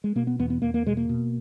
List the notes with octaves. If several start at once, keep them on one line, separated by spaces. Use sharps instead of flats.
G#3
B2 A#3
B3
E2 B3
B3
E2 A#3
A#3
B2 G#3
A#3
B2